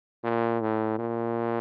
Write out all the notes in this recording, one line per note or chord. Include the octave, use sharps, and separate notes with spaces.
A#2
A2
A#2